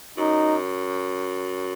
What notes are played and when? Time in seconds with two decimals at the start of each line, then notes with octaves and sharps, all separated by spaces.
0.18 F#2 D#4